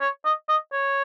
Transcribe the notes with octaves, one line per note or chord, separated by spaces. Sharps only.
C#5
D#5
D#5
C#5